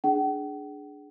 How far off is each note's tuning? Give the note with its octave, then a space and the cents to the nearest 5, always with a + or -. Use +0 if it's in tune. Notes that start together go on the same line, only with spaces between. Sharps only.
D4 +0 G#4 +10 F#5 +45